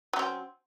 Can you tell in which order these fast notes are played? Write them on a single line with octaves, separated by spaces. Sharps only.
F#3 C#4 C4